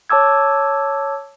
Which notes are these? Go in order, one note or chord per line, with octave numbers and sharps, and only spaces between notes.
C#5 A5 D6 E6 G#6